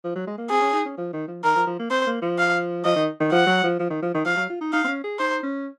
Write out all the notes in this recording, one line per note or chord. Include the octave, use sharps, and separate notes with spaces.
F3
F#3
G#3
A#3
C4 G#4
C#4
D#4
C#4
F3
D#3
F3
D#3 A#4
F3
F3
A#3
C4 C5
A#3
F3
F5
F3 D#5
D#3
D#3
F3 F#5
F#3
F3
F3
D#3
F3
D#3
F3 F5
F#3
F4
D#4
D#4 F5
C4
C#4
G#4
D#4 C5
C#4